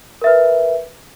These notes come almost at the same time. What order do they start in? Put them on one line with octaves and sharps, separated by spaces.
A#4 E5 B4